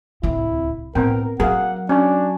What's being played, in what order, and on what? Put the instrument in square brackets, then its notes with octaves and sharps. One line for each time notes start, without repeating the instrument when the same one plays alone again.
[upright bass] D1 C4 [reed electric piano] C2 [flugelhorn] E4
[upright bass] A2 [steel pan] B3 C4 G5 [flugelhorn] A#4
[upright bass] F#3 [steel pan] G#4 [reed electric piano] A#4 F5 [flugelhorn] F#5
[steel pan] C#4 [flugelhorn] D4 [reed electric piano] F#4 G#5 C#6